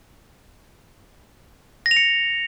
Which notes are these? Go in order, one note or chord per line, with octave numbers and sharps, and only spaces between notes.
A#6
F7
C#7